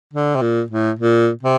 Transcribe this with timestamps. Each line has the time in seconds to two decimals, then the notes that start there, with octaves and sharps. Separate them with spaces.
0.14 D3
0.36 C3
0.42 A#2
0.71 A2
0.99 A#2
1.43 C3